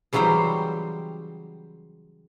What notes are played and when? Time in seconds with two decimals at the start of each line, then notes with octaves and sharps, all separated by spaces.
0.13 C#3 E3 F#3 G3 C5 G5